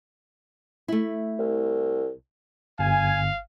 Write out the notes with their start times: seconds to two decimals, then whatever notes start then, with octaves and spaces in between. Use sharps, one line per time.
0.88 A3 E4
1.39 C2
2.79 G1 F5 G#5